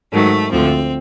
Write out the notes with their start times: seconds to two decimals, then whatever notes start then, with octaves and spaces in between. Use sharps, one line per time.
0.13 G#2 D#3 F#3 A3
0.51 D2 D3 F3 C4